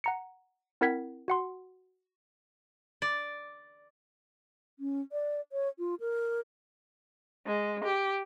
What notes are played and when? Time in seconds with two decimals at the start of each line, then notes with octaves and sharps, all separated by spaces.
0.04 F#5 A#5 C#7
0.81 C4 E4 A#4 F#5 G#6 B6
1.28 F#4 F#5 C6
3.02 D5
4.79 C#4
5.12 D5
5.52 C#5
5.79 F4
6.00 A#4
7.47 G#3
7.85 G4